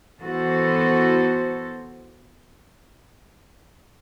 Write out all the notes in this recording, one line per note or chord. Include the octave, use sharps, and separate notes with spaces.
E3 B3 F#4 A4 C5